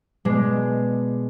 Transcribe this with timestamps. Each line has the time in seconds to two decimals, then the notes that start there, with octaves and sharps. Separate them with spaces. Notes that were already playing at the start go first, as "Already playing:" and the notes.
0.25 B2 G#3 D4